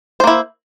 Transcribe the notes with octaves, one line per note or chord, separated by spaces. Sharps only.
A#3 E4 C5